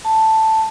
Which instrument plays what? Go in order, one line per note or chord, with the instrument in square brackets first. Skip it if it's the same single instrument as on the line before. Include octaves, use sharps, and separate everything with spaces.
[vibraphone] A5